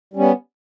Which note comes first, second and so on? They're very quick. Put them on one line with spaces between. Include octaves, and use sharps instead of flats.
G3 C#4 B3